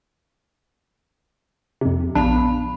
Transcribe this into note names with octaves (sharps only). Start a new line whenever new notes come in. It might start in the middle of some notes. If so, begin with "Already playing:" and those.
F2 C3
A#1 B3 D4 F5 B5